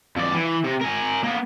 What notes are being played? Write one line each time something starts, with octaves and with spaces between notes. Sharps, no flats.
F2 D5
E3
C3
A#4 G#5
A#3 B3